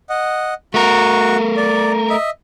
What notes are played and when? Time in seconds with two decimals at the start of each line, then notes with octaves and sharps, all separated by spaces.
0.10 D#5 F#5
0.74 A3 F#4 A#4 C#6
1.57 D5
2.10 D#5 E5